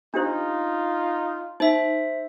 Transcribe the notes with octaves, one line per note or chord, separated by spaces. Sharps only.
D4 D#4 F4 G4 C5
D#4 C5 E5